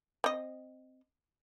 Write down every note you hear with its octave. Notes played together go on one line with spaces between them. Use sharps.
C4 D#5